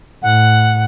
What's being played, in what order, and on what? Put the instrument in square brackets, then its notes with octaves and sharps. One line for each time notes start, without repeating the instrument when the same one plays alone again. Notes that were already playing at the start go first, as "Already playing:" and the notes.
[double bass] A2 [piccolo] F#5